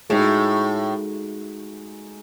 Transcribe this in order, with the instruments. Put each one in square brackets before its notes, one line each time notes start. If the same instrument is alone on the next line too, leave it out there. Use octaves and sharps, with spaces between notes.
[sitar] A2 [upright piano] G#3 D#4 F#4